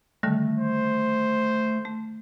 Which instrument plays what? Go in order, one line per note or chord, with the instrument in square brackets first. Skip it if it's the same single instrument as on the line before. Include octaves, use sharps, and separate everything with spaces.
[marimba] D3 D#3 G3 [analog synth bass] A3
[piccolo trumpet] C5
[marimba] A3